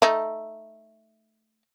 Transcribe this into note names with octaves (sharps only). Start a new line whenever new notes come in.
A3 D#4